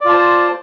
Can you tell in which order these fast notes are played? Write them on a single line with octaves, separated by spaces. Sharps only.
D5 F4 A5 C5